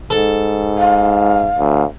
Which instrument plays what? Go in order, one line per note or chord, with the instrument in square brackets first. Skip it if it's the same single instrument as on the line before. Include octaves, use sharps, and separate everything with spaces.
[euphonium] G#2 [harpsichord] A4
[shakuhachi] F5
[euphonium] D2